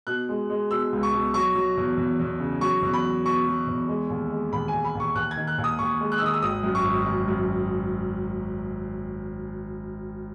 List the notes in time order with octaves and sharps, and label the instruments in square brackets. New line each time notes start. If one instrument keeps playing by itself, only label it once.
[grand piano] B2 F#6
G#3
G#3
B2 E6
C#2
C#6
B2
F#3 C#6
F#3
E2
E2
E2
C#3
F#3 C#6
E2
B5
F#3
B2 C#6
F#3
E2
G#3
D#2
G#3
D#2 B5
G#5
D#2
B5
D#2
C#6
D#2 F#6
G#6
D#3
F#6
D#2
D#6
D#2 C#6
G#3
F#6
E6
D#3 D#6
E6
G#1 D#6
F#2
C#6
G#1
F#2
F#2